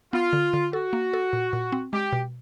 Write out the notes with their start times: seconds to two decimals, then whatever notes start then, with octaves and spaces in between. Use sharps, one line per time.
0.13 B3 F4
0.33 D3
0.53 D3
0.73 F#4 A4
0.93 A#3
1.13 A4
1.33 A#2
1.53 A#2
1.72 C4
1.93 G#3 G4
2.13 B2